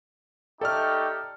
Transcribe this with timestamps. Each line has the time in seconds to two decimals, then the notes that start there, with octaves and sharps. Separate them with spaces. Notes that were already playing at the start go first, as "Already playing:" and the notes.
0.61 A3 D#4 G4 A4 D5 F6